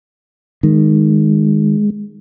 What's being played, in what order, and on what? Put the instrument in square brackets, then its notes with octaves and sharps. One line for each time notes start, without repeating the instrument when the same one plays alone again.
[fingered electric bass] D#3 [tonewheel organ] G#3